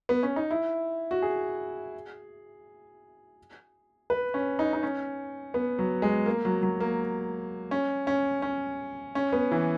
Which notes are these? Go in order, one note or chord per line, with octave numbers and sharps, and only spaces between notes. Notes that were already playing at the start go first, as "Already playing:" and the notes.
B3
C#4
D#4
E4
F#4
G#4
B4
C#4
D#4
D#4
C#4
B3
F#3
G#3
A#3
F#3
F#3
A#3
C#4
C#4
C#4
C#4
B3
E3